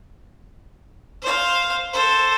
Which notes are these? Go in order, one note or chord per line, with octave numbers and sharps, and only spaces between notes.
C5 F5
A4 C5